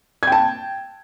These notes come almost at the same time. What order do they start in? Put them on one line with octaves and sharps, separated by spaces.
G#6 G5 A5